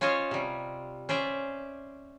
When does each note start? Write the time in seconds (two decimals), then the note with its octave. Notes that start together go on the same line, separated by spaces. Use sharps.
0.01 C#4 F4 C5 C#5 D#5
0.31 C3 G3
1.09 C#4 C5 D5 E5